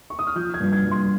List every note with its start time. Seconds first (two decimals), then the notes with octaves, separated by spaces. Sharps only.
0.10 C#6
0.19 D#6
0.27 F6
0.35 F3 G6
0.54 G#6
0.60 G2
0.73 G#6
0.85 G2
0.91 C6